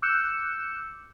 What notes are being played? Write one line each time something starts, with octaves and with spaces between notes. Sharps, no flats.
D6 E6 F#6 G6 C#7 E7